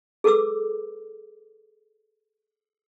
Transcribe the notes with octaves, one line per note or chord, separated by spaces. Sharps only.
G#4 A4 B4 D6 E6